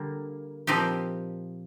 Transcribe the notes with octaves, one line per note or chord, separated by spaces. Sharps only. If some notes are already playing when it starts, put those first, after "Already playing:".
Already playing: D3 G3 A#3
A#2 F3 C4 D#4 G4